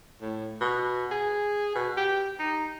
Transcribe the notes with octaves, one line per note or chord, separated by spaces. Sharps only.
A2
B2
G#4
B2
G4
D#4